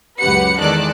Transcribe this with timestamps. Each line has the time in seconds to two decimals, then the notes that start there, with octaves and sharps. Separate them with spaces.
0.21 C#2 F#2 G4 B4 F#5 C#7
0.60 E2 D#3 G#3 A4 D5 F#6